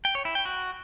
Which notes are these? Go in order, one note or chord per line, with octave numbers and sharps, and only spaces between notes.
G5
C#5
E4
G5
F#4